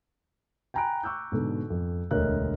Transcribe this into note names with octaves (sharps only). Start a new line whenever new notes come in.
G5 G#5 A#5 B5 F#6 D7
C#6 D6 E6 F#6 G6
G#2 B2 D3
F2
E1 D2 A#4 C#5 D#5 F#6